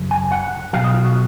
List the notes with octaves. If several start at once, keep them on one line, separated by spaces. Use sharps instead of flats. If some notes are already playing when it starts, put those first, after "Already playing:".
Already playing: F#2 C#3
G#5
F#5
B1 B2 F#3 F5
D#5
F4
F#4